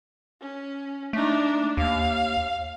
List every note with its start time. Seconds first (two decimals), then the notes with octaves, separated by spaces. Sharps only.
0.41 C#4
1.13 A3 D4 D#4
1.77 D#2 F5